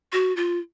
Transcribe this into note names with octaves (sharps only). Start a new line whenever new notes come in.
F#4
F4